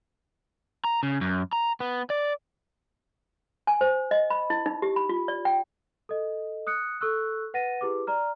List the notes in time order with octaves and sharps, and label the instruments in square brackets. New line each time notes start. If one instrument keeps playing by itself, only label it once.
[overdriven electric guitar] A#5
C#3
F#2
A#5
B3
D5
[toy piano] G#5
C5
D#5
B5
E4
D#4
G4
B5
F4
D5
G5
[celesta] A4 D#5
D#6 F#6 C#7
A4 C#6 E6 F#6
B4 F#5 A6 A#6 D#7
E4 G4 G#4 B4 D6
D5 A#5 F6